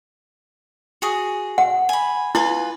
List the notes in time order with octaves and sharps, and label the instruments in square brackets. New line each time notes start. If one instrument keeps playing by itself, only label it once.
[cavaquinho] F#4 G#4
[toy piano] F#5
[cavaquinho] G#5 B5
[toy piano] E4 [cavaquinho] F4 B4 G#5